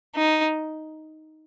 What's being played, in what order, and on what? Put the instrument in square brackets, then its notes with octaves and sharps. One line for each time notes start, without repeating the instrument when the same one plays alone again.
[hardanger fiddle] D#4